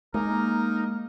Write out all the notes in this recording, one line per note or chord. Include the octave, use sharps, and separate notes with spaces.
G#3 A#3 D#4 A#4